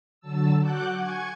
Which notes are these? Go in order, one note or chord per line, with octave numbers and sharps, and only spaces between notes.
D3 F#3 A5 E6
F#4 F#5 D6 F#6 G6
G#5 C#6 G#6